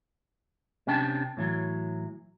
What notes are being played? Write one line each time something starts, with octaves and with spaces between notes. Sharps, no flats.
C3 C#4 D4 G5 A5
A2 E3 F#3